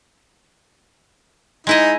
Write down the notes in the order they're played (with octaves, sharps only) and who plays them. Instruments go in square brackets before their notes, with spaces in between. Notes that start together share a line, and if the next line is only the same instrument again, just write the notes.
[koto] G#3 E4 D#5 [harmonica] D#4